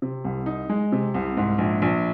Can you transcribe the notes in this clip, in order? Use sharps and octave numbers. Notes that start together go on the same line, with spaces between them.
C3
C2
D#4
G#3
C3
C2
G#2
A#1
A#1